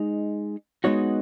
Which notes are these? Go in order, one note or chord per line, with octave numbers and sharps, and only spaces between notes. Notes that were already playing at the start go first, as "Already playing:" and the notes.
Already playing: G#3 D#4
G#3 B3 D#4 F#4 C#5